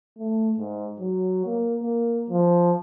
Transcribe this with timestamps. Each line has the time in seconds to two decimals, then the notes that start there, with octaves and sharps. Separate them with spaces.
0.18 A3
0.58 G#2
0.99 F#3
1.46 A#3
1.82 A#3
2.30 F3